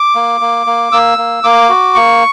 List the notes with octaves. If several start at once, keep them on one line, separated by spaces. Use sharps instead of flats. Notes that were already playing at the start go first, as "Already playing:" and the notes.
Already playing: D6
A#3
A#3
A#3
A#3 E6
A#3
A#3 D6
F#4
A#3 C#6